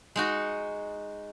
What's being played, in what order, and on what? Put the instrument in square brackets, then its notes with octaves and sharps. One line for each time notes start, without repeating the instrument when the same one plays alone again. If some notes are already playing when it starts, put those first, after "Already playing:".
[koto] G#3 D#4 F#4